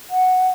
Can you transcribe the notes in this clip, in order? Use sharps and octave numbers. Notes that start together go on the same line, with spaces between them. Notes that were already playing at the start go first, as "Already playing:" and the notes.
F#5